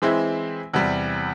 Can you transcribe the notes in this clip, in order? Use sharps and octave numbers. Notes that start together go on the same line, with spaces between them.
E3 G#3 C4 E4
E2 C3 G3